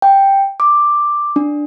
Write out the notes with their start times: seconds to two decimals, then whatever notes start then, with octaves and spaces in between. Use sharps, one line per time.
0.02 G5
0.60 D6
1.36 D4